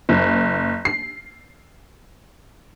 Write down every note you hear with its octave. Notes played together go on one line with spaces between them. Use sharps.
F#1
C7